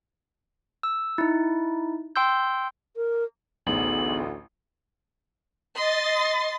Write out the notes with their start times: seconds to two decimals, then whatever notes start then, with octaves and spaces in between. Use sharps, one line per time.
0.83 E6
1.18 D#4 E4
2.16 G5 C6 E6 G6
2.96 A#4
3.67 A1 D2 B3 D#4 G#4 F#7
5.75 D#5 C6 A6